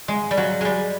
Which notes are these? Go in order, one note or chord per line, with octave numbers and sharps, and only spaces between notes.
G#3
G3
F#3
G3 G#3